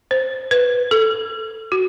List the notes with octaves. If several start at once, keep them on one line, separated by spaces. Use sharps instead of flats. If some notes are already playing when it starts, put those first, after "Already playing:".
C5
B4
A4
F#4